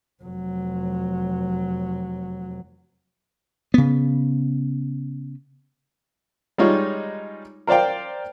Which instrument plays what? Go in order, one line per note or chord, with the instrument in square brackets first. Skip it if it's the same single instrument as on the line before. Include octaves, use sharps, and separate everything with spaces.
[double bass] F1 F#3
[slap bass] C#3 B3
[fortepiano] G3 G#3 D#4 F4 C#5
A#4 C5 D5 F5 G5